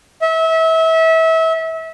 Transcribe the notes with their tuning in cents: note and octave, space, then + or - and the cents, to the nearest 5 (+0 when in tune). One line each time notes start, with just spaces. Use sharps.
E5 -30